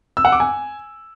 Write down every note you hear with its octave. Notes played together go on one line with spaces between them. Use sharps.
E6
F#5
D6
G#5